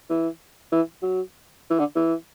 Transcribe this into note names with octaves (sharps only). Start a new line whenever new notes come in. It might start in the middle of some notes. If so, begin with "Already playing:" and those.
E3
E3
F#3
E3
D3
E3